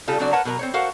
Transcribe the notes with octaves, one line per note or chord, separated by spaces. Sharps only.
C#3 G3 F4 G4 A4
C#3 F#3 C4 D4 F#4 D5
A#4 B4 C#5 F#5 A5
B2 F#3 A#4 D5 A#5
C4 C5 C#5
F#4 A4 A#4 C5 F5 F#5